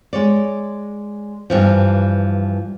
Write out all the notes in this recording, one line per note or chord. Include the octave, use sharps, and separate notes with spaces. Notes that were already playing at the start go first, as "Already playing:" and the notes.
G#3 C#5 D5
G2 E3 F3